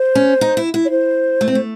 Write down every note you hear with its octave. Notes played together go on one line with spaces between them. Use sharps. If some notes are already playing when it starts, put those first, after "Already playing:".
Already playing: C5
C#4
D#4
E4
E4
C#5
C5
A3
C4
A3